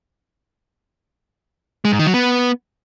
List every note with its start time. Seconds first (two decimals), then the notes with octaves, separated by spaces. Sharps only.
1.85 G#3
1.92 G#2
1.99 D#3
2.07 F#3
2.14 B3